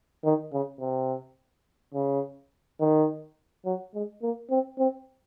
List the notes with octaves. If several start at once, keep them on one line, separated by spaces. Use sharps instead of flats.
D#3
C#3
C3
C#3
D#3
F#3
G#3
A#3
C4
C4